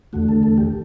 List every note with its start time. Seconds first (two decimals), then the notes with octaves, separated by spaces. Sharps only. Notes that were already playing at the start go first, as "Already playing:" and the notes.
0.13 E2 D3 A3 F#4
0.28 A4
0.43 A4
0.58 G4